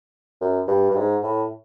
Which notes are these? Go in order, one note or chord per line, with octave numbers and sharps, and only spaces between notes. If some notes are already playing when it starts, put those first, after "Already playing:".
F#2
G2
G2
G#2
A2